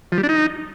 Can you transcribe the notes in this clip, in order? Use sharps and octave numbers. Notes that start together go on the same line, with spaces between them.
F3
G3
D4
D#4